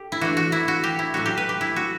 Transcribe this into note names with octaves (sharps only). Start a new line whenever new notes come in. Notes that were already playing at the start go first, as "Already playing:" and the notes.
Already playing: G4 A4
E4
E3 A3 D4 F#4
F#4
E4
F#4
G4
E4
A2 F#3 C#4 F#4
G4
B4
G4
E4
F#4